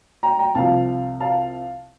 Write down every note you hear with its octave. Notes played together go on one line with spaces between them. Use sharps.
G5 A#5
G5 A#5
C2 C3 F3 F5 A5
F5 A5